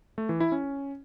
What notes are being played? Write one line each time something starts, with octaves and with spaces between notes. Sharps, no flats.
A3
E3
E4
C#4